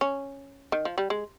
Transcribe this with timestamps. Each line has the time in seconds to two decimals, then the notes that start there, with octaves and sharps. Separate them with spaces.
0.01 C#4
0.72 D#3
0.85 F3
0.98 G3
1.10 G#3